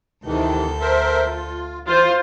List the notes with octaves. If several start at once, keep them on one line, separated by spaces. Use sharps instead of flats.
D2 C3 D#3 E3 A4 G6
A#4 C5 E5
F4
E3 F4 C5